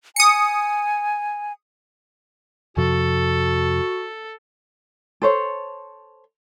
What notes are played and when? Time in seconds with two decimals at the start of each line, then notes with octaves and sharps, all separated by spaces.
0.16 G#5 D#6 C#7
2.77 F2 C3 F3 F#4 A4
5.22 A4 C5 C#5